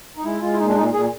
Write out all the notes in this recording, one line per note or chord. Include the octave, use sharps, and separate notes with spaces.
D#4
G#3 E4
G#3 F4
E4
A#2 D#4
D4
A#2 D#4
A#2 G#4